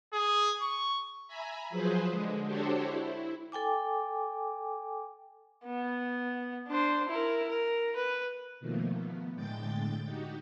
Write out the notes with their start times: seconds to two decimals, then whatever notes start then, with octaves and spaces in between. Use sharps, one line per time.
0.13 G#4
0.61 C#6
1.28 E5 G#5 A#5 B5
1.70 F3 F#3 G#4 B4 C5
2.09 D3 G#3
2.46 D4 F#4 G4 A4 C5 C#5
2.82 E4
3.52 A4 G5 G#5 D6
5.65 B3
6.68 D4 C5
7.09 E4 A#4
7.49 A#4
7.96 B4
8.60 B2 D#3 F3 A3 A#3
8.93 B3
9.34 A2 D3 G#3 G5 G6 A6
10.05 D#4 F#4 G4